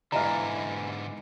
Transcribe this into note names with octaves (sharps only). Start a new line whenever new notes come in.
G#2 D3 E3 D5 D#5 F5 A#5 F6